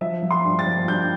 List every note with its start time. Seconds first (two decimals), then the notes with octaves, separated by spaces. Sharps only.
0.01 F3 E5
0.22 F3
0.31 C6
0.44 G2
0.59 A6
0.66 F3
0.88 G2 G6